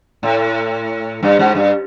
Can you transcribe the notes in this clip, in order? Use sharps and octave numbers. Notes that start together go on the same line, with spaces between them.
A2
G2
G#2
G2